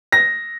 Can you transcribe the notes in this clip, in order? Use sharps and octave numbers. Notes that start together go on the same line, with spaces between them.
A#6